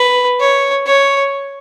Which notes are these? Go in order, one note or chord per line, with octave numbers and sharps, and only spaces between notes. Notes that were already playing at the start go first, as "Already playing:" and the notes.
Already playing: B4
C#5
C#5